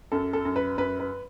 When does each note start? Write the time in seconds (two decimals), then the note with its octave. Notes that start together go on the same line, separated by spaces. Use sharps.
0.12 F#2 A4
0.33 A4
0.45 F#2
0.56 B4
0.78 F#2 B4
1.00 B4